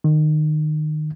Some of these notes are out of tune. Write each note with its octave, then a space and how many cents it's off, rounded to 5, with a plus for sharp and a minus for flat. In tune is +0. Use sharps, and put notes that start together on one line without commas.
D#3 -25